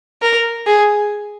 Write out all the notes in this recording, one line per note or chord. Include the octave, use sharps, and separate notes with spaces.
A#4
G#4